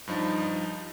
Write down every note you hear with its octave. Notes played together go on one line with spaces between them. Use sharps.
G2 F3 D#4